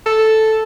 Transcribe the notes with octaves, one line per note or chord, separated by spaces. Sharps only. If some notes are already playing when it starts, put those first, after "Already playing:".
A4